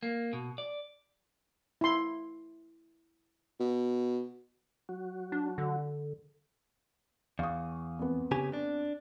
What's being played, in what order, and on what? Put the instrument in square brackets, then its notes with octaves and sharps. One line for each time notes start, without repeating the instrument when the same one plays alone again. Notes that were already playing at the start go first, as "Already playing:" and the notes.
[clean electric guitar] A#3
B2
D5
[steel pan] E4 C6
[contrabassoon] B2
[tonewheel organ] F#3 F#4
[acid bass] D4
D3
[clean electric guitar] E2 [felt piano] F5 C#6 D#6
[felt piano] F2 B3
[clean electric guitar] C#3 G4 G#5
D4